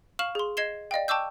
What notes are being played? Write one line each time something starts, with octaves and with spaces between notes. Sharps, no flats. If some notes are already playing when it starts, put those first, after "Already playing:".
F5 C#6 F6 E7 F#7
G#4 C6
D#5 G#6 C7 E7 G7
D5 D#5 F5 G5
G5 A5 C#6 D6 E6 G6